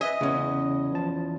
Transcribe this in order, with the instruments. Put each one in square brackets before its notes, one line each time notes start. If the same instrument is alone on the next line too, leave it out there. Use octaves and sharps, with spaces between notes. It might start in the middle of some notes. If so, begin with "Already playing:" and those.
[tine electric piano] B4 E5 G#5 [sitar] D#5
[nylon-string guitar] E2 C#4 [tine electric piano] C#3
[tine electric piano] E3 F3 A5